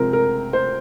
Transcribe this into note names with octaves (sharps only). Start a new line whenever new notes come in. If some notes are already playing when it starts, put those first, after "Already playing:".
Already playing: C3 F3 G#3 C4 A#4
A#4
C5